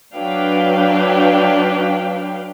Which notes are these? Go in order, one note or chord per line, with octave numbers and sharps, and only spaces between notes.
F#3 D4 B4 F5 G5